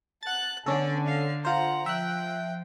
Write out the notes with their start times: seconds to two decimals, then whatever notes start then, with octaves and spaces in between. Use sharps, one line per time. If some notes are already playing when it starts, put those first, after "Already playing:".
0.23 F#5 A5 F#6 A6
0.66 D3 B3 C#4 A4 D5
1.07 F5
1.45 F4 C5 F#5 A#5
1.86 F3 E5 G5 F#6